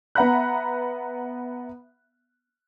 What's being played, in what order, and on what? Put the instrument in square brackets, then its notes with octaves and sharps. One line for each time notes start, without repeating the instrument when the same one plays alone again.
[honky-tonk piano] B3 E5 F#5 A#5 B5 F#6